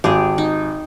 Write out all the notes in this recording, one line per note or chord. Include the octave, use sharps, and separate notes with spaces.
G#1 G4 G#4
D#4